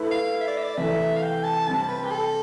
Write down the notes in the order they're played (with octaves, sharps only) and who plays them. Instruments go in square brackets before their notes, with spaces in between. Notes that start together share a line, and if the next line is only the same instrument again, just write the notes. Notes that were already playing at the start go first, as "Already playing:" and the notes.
Already playing: [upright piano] A3 E4 B4
[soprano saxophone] F5
E5
D5
E5
D5
[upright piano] C3 E3 A3 [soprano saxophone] E5
[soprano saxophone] F5
G5
A5
[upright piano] C3 G3 C4 [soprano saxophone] A5
[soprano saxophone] B4
G4
A4